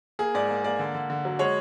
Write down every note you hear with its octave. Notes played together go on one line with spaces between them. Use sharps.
A#3 G#4
G#2 D5
A#3
A#3 D5
D3
D3
D3
F#3
G#3 C#5